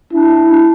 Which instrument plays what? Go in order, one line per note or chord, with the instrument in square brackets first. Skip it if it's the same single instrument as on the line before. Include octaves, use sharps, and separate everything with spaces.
[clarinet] D4 [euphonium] E4
[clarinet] D4